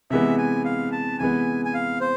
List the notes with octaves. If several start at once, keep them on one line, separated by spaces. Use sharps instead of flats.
C3 E3 G#3 B3 E5
G#5
F5
A5
C3 E3 G#3 B3 G#5
G#5
F5
C5